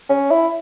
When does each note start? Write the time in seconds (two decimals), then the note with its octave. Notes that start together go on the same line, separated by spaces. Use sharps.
0.10 C#4
0.31 E4